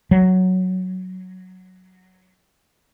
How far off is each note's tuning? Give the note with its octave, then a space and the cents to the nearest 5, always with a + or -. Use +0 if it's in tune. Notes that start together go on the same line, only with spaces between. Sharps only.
F#3 +0